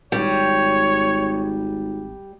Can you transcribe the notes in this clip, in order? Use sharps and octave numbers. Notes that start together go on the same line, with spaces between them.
G#1 G3 C#5